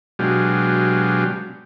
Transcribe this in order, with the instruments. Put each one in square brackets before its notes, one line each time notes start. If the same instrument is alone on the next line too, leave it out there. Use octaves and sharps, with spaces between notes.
[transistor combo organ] B2 F#3 G#3 D4 F4 G4